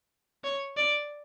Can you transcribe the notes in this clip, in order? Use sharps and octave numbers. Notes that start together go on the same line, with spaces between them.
C#5
D5